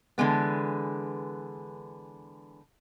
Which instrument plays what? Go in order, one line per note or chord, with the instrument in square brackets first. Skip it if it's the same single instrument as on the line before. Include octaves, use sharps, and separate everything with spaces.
[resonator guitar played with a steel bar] D3 E3 G#3 B3